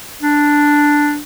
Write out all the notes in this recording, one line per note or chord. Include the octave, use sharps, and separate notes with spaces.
D4